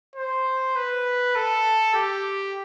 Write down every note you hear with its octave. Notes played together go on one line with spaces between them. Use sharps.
C5
B4
A4
G4